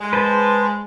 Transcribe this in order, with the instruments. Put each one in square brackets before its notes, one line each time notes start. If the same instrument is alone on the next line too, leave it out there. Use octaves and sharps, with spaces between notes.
[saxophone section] G#3
[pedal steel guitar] B4 C5 A5